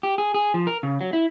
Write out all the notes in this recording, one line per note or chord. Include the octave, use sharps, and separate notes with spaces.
G4
G#4
G#4
F3
A#4
C#3
F#3
E4